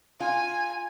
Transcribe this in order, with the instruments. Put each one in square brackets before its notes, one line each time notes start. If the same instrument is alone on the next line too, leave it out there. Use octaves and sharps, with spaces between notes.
[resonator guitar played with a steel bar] F4 [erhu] G#5